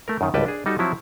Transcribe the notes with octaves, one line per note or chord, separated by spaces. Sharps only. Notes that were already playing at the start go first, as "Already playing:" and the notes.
A3 A#4
F#2 D#3
G#1 C#2 G3 B4 G5 A5
D4 G#4
G3 D#4 F#4 A4
F3 F#3 C4 E4